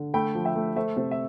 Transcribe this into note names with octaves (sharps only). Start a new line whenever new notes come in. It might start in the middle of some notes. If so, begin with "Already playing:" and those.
Already playing: D3
A3 G5 B5
F3
E5 G5
A3
A3 C5 E5
C3 A4 C5
E5